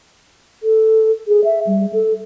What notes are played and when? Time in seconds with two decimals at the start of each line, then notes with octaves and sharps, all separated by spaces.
0.63 A4
1.27 G#4
1.44 E5
1.67 G3
1.93 A4